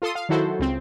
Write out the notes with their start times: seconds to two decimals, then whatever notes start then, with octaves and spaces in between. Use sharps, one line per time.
0.02 F4 A4 C6 D#6
0.15 F5
0.29 D#3 F#3 E4 F#4 A4 C5
0.59 C#2 C4